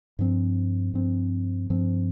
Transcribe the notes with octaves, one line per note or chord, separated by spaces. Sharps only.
G2 F3 C4
G2 F3 C4
G2 F3 C4